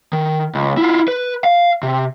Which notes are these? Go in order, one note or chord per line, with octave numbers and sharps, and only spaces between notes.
D#3
C#2
E4 F4
B4
F5
C3